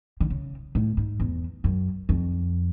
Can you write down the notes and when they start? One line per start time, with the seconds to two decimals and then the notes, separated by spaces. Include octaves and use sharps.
0.20 D3
0.30 C#3
0.75 A2
0.97 G#2
1.20 E2
1.64 F#2
2.09 F2